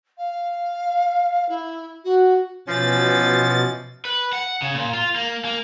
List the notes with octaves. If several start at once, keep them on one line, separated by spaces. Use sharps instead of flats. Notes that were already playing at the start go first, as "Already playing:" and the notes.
F5
E4
F#4
B2 E3 F3 C#4 A6
B4
F#5
C#3
A#2
F4
A#3
A#3